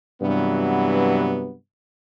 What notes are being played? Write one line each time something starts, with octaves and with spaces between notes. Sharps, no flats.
G2 C3 E3 F#3 B3